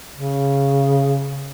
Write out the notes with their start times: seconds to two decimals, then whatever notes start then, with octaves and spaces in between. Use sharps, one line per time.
0.16 C#3